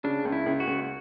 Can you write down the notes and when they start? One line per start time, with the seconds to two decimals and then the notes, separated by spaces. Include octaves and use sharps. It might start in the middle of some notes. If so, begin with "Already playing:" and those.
0.04 C#3 D4
0.25 C#2
0.32 E4
0.46 C#2
0.60 F#4
0.67 C#2